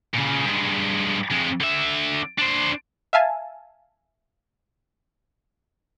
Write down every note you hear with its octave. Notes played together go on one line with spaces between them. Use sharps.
A#2 C#3
G2 G#3
F2 G#3
D3 E5
D4 C5
E5 F5 G#5 A5